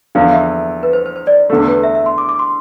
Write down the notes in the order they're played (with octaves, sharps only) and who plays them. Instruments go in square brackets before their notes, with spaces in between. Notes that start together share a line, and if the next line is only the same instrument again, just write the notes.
[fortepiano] E2 D3 F3 [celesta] F5
[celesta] E5
B4
C5
C5
C5
D5
[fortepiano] E2 D3 A3
[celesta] A4
B4
E5
E5
C6
D6
D6
C6